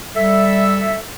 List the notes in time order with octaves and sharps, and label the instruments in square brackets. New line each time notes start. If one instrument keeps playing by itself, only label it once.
[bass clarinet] G3 [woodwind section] A4 E5